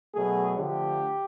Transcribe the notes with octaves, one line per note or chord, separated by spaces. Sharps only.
B2 F#3 A3 G#4
D3 F3 A3 G4